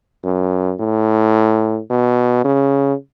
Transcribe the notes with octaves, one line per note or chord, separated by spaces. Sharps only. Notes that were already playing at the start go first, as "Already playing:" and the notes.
F#2
A2
B2
C#3